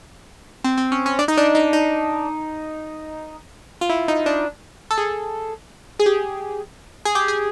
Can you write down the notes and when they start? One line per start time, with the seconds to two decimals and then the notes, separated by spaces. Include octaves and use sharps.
0.64 C4
0.78 C4
0.92 C#4
1.06 C#4
1.19 D4
1.28 D#4
1.37 D4
1.55 D#4
1.73 D#4
3.81 F4
3.89 E4
4.08 D#4
4.26 D4
4.91 A4
4.98 G#4
5.99 G#4
6.06 G4
7.05 G#4
7.15 G4
7.28 G#4